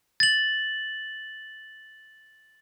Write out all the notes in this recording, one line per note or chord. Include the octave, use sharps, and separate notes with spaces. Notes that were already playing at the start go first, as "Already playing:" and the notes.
A6 F#7